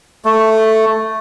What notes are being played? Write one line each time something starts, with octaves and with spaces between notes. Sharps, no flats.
A3